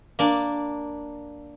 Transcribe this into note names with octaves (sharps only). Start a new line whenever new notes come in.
A#3 D4